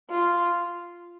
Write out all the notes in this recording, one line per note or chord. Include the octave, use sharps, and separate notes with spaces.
F4